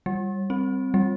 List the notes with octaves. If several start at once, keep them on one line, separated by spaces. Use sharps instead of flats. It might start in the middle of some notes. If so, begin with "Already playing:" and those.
G3
C4
G3